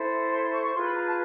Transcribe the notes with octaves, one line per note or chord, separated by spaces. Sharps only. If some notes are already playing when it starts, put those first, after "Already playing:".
Already playing: E4 A4 C5
C6
C6
C#6
C#6
F4 G#4 B4 C6
B5
A#5
A5